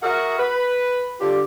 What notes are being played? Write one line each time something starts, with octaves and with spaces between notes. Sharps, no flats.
F#4 G#4 A#4 E5 F#5
B4
D3 D4 F4 G4